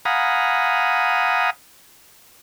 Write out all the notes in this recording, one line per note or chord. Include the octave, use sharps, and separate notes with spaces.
F5 F#5 G#5 A#5 B5 D#6